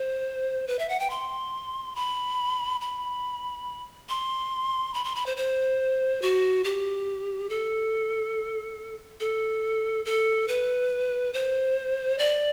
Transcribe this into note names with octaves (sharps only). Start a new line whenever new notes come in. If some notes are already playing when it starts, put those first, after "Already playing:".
Already playing: C5
B4
E5
F#5
G5
C6
B5
B5
C6
B5
C6
B5
C5
C5
F#4
G4
A4
A4
A4
B4
C5
D5